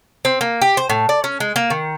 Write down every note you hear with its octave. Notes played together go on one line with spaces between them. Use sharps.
C4
A#3
G4
C5
A2
D5
C#4
G#3
A#3
D#3